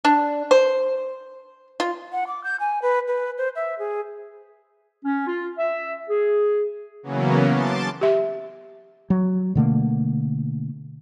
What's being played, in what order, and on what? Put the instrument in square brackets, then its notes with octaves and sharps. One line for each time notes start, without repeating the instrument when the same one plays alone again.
[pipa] D4
C5
F4
[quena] F#5
D6
G6
G#5
B4
B4
C5
E5
G#4
[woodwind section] C#4
F4
E5
G#4
[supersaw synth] C#3 E3 F#3 A#3 B3 C#4
A5 C6 D6 A6
[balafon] G4 E5
[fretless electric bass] F#3
B2 D3 A3 A#3